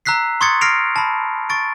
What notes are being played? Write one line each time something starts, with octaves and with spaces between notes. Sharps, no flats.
A#5 E6 F#6 B6 C7
C6 C#6 D#6 G#6 A6 C#7
F6 A#6 C7 D7 F7
A5 B5
C#6 A6 D7